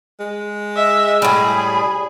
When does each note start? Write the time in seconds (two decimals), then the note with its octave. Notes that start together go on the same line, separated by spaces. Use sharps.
0.20 G#3
0.76 D#5 E5
1.22 A2 G3 G#4 B5